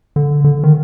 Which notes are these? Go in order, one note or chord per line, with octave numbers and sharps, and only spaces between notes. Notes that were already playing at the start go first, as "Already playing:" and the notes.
D3
D3
D#3